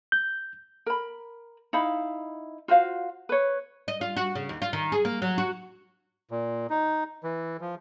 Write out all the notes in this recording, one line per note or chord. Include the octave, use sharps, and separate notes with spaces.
G6
A#4 B5
D#4 E4 F5 B5
F4 F#4 C5 F5
B4 C#5
D#5
F4
F#4
C#3
D#2
F4
D#3
G#4
A#3
F#3
F#4
A#2
D#4
E3
F3